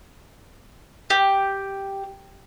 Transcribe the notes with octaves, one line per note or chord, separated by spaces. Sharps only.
G4